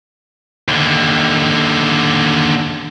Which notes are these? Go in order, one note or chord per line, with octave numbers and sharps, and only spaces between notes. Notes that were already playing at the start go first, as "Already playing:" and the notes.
D#2 D3